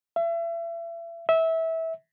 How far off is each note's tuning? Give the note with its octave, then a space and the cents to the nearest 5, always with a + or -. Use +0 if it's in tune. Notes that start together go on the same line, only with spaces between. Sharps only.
E5 +35
E5 -20